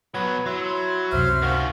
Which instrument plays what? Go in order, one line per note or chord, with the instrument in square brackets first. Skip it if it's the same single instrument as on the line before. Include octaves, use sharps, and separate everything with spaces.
[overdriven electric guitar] B2 F#3 [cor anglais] B4 [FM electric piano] F#5
[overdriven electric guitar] F#3 [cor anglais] E4 [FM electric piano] C6
[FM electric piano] C#2 F#2 C3 [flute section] C5 E5 F6
[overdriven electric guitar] D#3 F4 [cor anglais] F#4